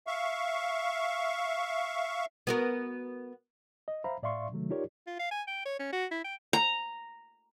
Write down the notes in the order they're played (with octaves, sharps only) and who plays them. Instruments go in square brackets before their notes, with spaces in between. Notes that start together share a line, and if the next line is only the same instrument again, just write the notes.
[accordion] E5 F5 C#6
[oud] B3 F#4 A#4
[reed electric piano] D#5
C5 E5 F5 A#5 B5
A2 D5 E5 F5 C6 C#6
C3 D#3 F#3 A3
D#4 F4 G4 A#4 C#5 D5
[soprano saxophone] F4
F5
G#5
G5
C#5
C#4
F#4
E4
G5
[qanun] A#5